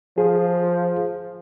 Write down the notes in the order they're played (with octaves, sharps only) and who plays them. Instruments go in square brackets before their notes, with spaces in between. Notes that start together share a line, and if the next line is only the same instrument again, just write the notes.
[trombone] F3 [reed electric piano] G#4